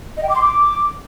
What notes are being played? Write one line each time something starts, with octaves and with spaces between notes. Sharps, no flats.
D#5
G5
D6
C6
D6